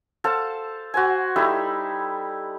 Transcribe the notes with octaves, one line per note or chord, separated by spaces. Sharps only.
A4 C5 F5 A5
F#4 C5 G#5
G3 D#4 E4 A4